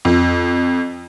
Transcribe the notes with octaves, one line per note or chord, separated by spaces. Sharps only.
F2